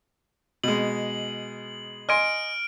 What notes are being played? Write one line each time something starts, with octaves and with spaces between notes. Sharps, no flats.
B2 G#3 F#7
D#5 G#5 C6 F6 D7